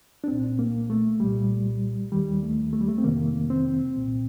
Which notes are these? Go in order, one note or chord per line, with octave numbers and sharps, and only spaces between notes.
D4
C2 A#2 C4
A#3
A3
C2 A#2 G3
D#2 D#3 G3
A3
A3
G3
A3
C4
F2 C3 D#3 A#3
C4
C2 A#2